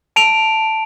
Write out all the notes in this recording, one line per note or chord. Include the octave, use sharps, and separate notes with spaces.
A5 D7 F7